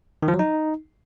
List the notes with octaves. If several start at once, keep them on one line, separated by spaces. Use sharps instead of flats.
D#3
F3
F#3
D#4